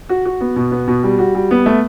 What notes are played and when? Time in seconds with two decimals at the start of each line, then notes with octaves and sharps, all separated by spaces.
0.09 F#4
0.26 F#4
0.41 B3
0.56 B2
0.72 B3
0.88 B2
1.03 G3
1.19 F#4
1.35 G3
1.51 B3
1.66 A3